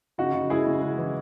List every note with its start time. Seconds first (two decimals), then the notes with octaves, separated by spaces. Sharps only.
0.18 C#3 D#4 F#4
0.34 C#3
0.50 G#3 E4 G#4
0.66 C#3
0.82 G#3
0.98 E3